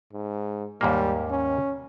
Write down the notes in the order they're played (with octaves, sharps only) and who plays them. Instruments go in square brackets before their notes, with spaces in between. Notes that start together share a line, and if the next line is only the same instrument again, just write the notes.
[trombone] G#2
[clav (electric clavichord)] D#2 G#2 A#3 [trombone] G3
[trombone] C#4